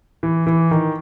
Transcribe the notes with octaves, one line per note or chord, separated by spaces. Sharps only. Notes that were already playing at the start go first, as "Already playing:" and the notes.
E3
E3
D#3